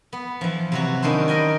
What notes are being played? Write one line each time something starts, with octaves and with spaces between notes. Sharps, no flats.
B3
E3 F3
C3 F#3 F#4
D#3 C#4 D4 E4 C5
A#4 D#5 G5 G#5